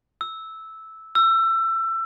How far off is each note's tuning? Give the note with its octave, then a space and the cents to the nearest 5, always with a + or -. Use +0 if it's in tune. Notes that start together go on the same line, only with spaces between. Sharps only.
E6 -10
E6 +25